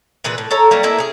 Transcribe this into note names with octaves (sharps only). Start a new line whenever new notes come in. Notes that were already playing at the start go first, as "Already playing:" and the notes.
A#2 E3 G#4 B4
A2
A4 C#5 A#5
F#3 G3 A#3
A3 A#3 E4 E5
C#4 G#4